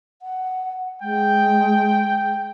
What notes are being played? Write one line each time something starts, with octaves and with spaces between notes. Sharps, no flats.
F#5
G#3 G5